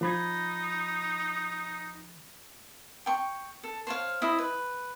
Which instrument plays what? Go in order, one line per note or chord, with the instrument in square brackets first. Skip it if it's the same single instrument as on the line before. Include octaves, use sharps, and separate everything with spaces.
[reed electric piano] F3 B5 G#6 [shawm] D#4
[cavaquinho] G5 C#6
A4
C5 C#5 F5
E4 C5 D#5 E5
B4